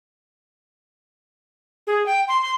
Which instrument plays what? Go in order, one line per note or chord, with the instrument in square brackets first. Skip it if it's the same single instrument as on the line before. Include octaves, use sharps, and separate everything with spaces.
[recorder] G#4
G5
C6
C6